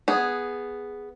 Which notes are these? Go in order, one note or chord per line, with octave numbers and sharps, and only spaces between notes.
B3 G#4